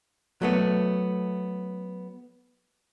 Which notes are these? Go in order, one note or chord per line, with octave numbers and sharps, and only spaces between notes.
F#3 A3 B3